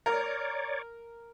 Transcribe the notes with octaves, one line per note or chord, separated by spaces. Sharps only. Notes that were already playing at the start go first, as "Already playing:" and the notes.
A#4 C#5 D5